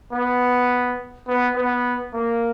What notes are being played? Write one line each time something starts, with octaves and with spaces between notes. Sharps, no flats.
B3
B3
B3
A#3